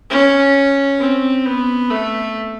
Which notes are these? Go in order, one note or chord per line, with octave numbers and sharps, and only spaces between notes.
C#4
C4
B3
A3